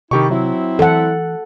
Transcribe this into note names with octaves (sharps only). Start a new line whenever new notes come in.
C3 D#3 E4 G4 A4 C#6
F#3 C4 E4
E3 A4 F#5